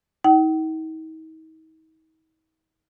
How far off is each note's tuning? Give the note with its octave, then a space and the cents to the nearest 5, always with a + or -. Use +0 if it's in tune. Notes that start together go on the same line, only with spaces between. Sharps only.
D#4 +40 G5 -45